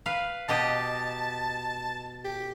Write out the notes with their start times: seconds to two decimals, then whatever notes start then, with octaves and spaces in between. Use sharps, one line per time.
0.06 B4 F5
0.49 B2 G4 D#5 A5
2.25 G4